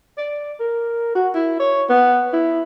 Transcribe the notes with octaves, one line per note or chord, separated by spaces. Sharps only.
D5
A#4
F#4
E4
C#5
B3
E4